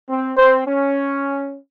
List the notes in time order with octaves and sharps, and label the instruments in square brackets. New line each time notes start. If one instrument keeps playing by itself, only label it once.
[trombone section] C4
[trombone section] C4 [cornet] C5
[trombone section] C#4